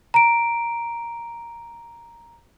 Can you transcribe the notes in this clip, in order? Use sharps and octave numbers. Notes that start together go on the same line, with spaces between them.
A#5 D7